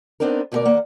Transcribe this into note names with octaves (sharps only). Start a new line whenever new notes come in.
B3 C4 D4 D#4 A#4
D2 B2 F4 G#4 A#4 D5
D#2 A#3 F#5